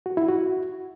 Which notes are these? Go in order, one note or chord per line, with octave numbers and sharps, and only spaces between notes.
F#4
E4
F#4